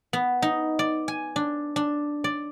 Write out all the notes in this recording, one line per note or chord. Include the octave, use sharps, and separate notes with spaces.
B3
D#4
D5
G#5
D4
D4
D5